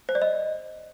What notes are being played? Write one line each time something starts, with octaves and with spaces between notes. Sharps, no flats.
C5
D5
D#5